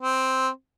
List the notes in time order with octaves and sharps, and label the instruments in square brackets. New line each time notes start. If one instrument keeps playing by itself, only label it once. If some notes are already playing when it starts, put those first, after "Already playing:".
[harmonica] C4